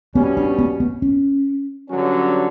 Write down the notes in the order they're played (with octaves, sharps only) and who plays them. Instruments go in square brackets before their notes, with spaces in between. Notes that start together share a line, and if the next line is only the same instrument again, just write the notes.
[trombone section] B2 G3 C#4 [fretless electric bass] B3
[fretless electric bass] D4
B3
B3
C#4
[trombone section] G2 D3 F#3 C#4